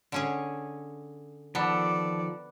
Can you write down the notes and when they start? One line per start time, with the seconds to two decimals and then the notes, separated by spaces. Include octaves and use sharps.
0.12 D3 C#4 G#4
1.55 D#3 F3 B3 A4 D5